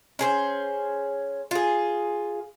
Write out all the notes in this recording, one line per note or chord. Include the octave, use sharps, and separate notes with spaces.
C#4 G#4 C5
F4 G#4